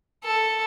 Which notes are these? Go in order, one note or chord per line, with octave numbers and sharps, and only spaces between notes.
A4